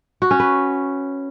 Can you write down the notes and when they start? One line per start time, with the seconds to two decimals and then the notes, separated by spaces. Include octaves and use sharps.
0.22 F#4
0.31 C#4
0.40 B4